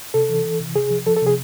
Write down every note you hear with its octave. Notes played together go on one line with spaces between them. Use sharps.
C3 A4
E3
E3
C3
C3 G#4
F3
F3 A4
A4
C3
G#4